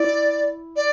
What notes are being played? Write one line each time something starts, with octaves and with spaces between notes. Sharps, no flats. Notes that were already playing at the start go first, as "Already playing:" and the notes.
Already playing: E4 D5
D5